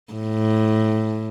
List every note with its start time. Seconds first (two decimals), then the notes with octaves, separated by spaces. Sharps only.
0.13 A2